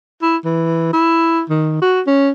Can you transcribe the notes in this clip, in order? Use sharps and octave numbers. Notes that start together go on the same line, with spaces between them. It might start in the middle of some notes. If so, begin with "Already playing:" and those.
E4
E3
E4
D#3
F#4
C#4